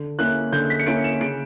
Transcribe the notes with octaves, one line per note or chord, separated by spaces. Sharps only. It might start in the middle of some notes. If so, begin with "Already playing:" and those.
Already playing: D3
A#3 C#4 E4 F#6
D3 G6
B6
C#7
A#3 C#4 E4 D7
E7
C#3 D7